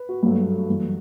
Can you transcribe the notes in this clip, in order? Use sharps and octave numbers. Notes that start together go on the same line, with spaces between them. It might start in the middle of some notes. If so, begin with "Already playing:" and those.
Already playing: B4
F#4
G2 F#3 A3
F#2 E3 G3